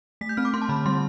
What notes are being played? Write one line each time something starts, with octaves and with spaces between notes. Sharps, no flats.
A3 B6
G6
C4 F6
D6
C4 C6
A5
D3 B5
G3 C6